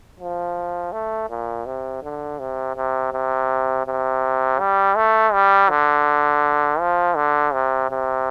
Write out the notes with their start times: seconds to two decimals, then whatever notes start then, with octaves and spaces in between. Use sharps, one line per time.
0.20 F3
0.92 A3
1.30 A#2
1.66 C3
2.03 D3
2.39 C3
2.76 C3
3.13 C3
3.86 C3
4.60 G3
4.96 A3
5.33 G3
5.70 D3
6.80 F3
7.16 D3
7.53 C3
7.90 C3